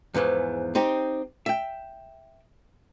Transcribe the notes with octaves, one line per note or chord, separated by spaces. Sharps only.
E2 G#2 E3 F3
C4 D#4 G4
E5 G5